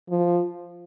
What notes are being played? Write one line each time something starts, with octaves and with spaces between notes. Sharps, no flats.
F3